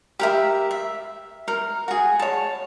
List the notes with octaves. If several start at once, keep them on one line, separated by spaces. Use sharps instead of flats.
G4 A#4 E5
E5
A#4
F#4 G#4
C#5 A5